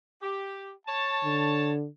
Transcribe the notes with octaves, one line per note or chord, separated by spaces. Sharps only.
G4
C#5 A5
D3